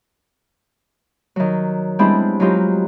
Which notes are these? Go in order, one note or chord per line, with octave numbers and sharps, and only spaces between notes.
D#3 F#3
G3 G#3 B3 C4 D4 E4
F#3 G#3 D#4 F4 G4